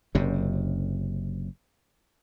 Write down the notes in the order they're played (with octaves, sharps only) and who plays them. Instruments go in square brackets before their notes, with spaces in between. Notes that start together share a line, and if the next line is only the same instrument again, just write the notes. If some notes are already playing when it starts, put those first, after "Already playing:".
[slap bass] F#1 F#2 C3